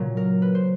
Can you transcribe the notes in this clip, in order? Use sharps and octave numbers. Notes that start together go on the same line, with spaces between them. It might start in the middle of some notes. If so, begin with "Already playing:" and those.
Already playing: A#2 C#3 F#3
A#4
B4
C5